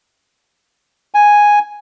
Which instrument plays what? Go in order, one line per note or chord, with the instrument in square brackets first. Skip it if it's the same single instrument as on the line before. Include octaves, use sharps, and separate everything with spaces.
[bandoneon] G#5